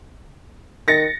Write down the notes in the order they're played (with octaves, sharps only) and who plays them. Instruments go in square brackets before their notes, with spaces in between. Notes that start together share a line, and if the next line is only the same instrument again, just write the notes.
[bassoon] D#3 [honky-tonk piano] A6 A#6 C#7